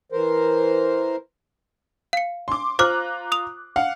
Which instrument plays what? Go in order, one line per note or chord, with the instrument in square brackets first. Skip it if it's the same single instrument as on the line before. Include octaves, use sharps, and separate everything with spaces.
[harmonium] E3 A#4 C5
[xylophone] F5 C#7
[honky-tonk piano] C6 D6
[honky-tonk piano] F4 A#5 F#6 [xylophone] C5 D6 F6
[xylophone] D#6 F7
[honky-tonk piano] F5 F#5